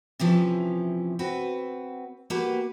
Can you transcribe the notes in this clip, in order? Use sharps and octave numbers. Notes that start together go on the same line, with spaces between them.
C3 E3 F3 C#4
C4 F#4 B4
A#3 F#4 G4 B4